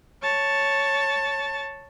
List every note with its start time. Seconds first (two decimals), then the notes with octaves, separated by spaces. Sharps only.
0.23 C#5 A5